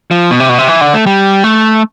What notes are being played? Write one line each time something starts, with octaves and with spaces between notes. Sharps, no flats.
F3
B2
C3
B2
C3
E3
D3
A3
G3
A3